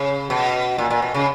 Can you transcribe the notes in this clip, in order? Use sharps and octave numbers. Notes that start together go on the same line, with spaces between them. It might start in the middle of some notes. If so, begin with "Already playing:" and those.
Already playing: C#3
B2
A#2
A#2
B2
C#3